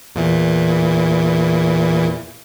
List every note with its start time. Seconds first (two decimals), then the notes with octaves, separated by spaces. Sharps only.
0.15 E2 A#2 E3